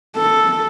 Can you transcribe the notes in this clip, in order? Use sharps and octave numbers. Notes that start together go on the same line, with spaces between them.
A4